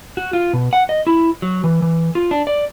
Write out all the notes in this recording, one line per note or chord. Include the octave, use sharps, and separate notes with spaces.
F#4
F4
B2
F#5
D#5
E4
F#3
E3
E3
F4
D4
D5